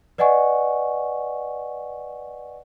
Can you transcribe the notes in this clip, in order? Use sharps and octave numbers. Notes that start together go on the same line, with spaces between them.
B4 D5 D#5 F#5 G#5 C#6